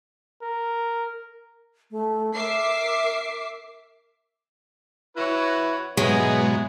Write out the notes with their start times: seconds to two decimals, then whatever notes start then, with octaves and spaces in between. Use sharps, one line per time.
0.42 A#4
1.91 A3
2.34 A#4 E5 D6 C7
5.17 E4 F#4 B4 C#5
5.97 G#2 B2 F#3 G#3 B3 E4 G#4 C#5